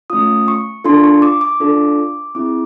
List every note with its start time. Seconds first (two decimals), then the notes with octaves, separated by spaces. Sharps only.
0.10 A3 C#4 F4 D#6
0.48 C#6
0.84 D4 F4 A4 C6
1.04 C#6
1.22 D6
1.41 D6
1.60 D4 F4 A4
2.35 C4 E4 G#4 D6